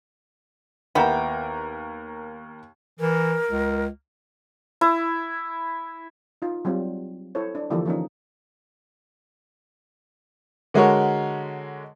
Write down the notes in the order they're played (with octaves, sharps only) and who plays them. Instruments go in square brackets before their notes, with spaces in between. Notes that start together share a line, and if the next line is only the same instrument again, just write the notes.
[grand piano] D#2 A#4 A#5 [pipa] B3 E4 G4
[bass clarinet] E3 [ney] A#4
[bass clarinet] C#2
[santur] E4
[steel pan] D#4 F4
F#3 G3 C4 F4
E4 A4 C5 C#5
D4
D3 E3 F3 A#3 G4 A4
F3 A#3 C#4 D#4
[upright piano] D3 G#3 F#4 A#4 C#5